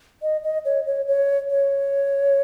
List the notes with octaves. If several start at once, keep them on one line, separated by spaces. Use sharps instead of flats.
D#5
D#5
C#5
C#5
C#5
C#5